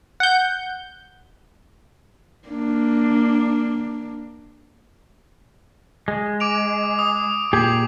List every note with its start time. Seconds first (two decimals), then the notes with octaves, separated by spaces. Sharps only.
0.20 F#5 G6
2.48 A#3 D4
6.08 G#3
6.40 D6 D7 F7
6.99 D#6
7.53 A#2 G4 G#4 D6